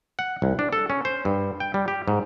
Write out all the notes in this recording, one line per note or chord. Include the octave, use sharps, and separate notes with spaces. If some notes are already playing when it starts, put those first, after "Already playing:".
F#5
C2
D4
A4
C#4
C5
G2
G5
G3
G4
G#2